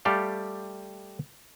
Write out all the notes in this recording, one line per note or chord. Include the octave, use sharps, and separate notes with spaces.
G3 A3 G4 A4 F5